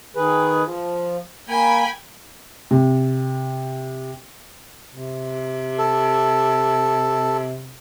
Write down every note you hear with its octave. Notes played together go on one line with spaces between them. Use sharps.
D#3 G#4 B4
F3
A#3 G5 G#5 B5
C3
C3
A4